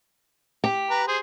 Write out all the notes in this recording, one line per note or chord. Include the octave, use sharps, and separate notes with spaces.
G4
B4 A#5
G#4 C5